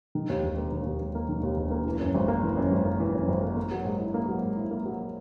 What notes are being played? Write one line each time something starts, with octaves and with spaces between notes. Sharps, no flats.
D#3
D#2
E1
A#3
D#3
D#2
E1
A#3
D#3
D#2
E1
A#3
E3
F#2
G#1
A#3
E3
F#2
G#1
A#3
E3
F#2
G#1
A#3
A#3
F#3
G#2
E4
A#3
F#3
G#2
E4
A#3
F#3